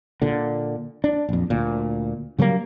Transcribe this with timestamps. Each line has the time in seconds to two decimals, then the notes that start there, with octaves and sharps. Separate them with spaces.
0.22 A#2 D3
1.04 D4
1.29 A#1 F2
1.50 D2 A#2
2.38 C#3 F#3 G3 A#3